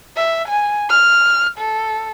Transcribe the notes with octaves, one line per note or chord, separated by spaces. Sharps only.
E5
G#5
F6
A4